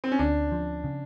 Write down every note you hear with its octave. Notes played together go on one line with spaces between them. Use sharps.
C4
C#4
D2 D4
F3
C#3